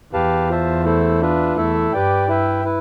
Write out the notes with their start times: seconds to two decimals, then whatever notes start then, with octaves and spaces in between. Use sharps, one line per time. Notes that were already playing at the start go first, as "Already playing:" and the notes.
0.13 E2 G4 B4 F5 A5
0.49 F4 C5 E5 A5
0.85 A3 E4 A4 C5
1.21 D4 F4 B4 E5
1.56 E2 A3 E4 A4 E5
1.92 G2 G4 B4 D5 G5
2.28 E4 B4 E5 G5
2.64 E4 B4